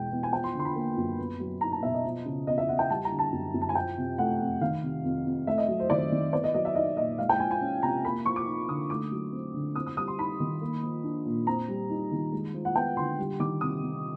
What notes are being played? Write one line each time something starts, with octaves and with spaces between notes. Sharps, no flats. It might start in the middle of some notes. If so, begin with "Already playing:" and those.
Already playing: E2 B2 G#3 G5
E2
G#5
F3 G5
C6
D3 C6
B5
A#3
F#2
B3
F#3
D#4 A#5
A5
B2 E5
D#5
F3
C#3
E2 D#5
E5
E2 F#5
G5
G3 A5
A#5
D3
A5
F#2
F#2
A5
G#5
F3 G5
C3
A3 F#5
F2
D#3 F5
C3
F2
F2
A3 E5
D#5
F#3
C5
D#3 D5
D#3
B3 D5
D#5
F#3 D#5
E5
D#4 D#5
A#2 D#5
G#3 F5
G5
F3 G#5
G#5
C#4
C3 A#5
A#3 B5
F3 C#6
D6
D#4
D3 D#6
A3 D6
F#3
C4
D3
C4 D#6
D#6
G3 D#6
C6
D#4 B5
D#3
A#3
F3
D4
A#2
C4 A#5
G3
D#4
D#3
G#3
F3
F#5
B3 G5
D3 C6
G3
D#3 D6
C3 D#6
C3